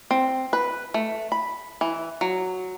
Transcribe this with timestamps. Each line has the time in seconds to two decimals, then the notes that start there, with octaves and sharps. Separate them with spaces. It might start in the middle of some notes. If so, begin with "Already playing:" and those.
0.11 C4
0.53 B4
0.94 A3
1.32 B5
1.81 E3
2.21 F#3